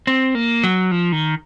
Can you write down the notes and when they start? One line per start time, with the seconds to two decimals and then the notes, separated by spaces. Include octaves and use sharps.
0.07 C4
0.35 A#3
0.64 F#3
0.91 F3
1.12 D#3